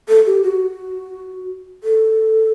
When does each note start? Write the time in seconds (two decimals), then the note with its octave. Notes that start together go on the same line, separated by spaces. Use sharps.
0.08 A4
0.26 G4
0.43 F#4
1.84 A4